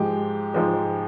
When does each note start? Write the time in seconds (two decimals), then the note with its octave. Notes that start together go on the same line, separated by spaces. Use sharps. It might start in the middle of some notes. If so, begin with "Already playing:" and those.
Already playing: G#2 F3 G#3 G4
0.54 G#2 F3 G#3